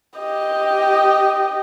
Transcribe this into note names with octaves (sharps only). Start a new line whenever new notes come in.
G4 D#5